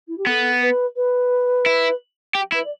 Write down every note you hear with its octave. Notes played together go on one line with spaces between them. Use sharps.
E4
G4
B3 A4
B4
B4
E4
G4
E4 B4
D5